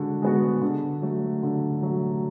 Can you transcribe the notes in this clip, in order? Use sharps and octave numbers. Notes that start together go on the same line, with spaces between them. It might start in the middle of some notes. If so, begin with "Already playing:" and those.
Already playing: D3 G#3 F#4
G#3 B3 F#4
D3
F#3 A3
D3
F#3 A3